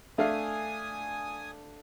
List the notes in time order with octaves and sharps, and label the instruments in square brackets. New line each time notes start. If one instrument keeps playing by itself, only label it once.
[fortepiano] A3 D4 F5 [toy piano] A4 E5 [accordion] G#5 D#6